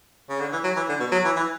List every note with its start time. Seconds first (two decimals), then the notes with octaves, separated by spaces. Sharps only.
0.29 C#3
0.40 D3
0.52 E3
0.64 F#3
0.76 E3
0.89 D3
1.00 B2
1.12 F#3
1.25 E3
1.36 E3